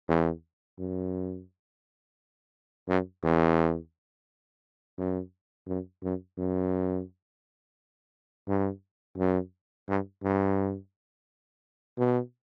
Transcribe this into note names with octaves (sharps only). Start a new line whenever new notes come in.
E2
F#2
F#2
E2
F#2
F#2
F#2
F#2
G2
F#2
G2
G2
B2